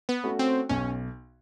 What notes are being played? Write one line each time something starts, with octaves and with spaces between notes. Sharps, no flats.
B3
A3 C#4 F#4
C4
B1 C#4